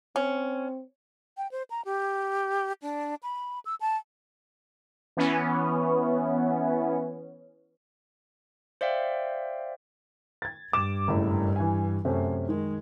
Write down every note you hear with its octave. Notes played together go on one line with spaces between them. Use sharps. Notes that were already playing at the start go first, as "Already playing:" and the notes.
C4 C#4
G5
C5
A#5
G4
D4
B5
E6
A5
E3 B3 C#4
C5 D5 E5 F5 G5
G#6 A6
G2 D6 E7
F#1 A2
E3 G#5
F#2 C3 A3 C#4
D#3 G#3